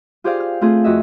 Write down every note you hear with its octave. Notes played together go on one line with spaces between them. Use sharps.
F4 G4 G#4 C5 D5 F5
F6
A3 C4 F4 G#4
F2 F#4 D#5 E5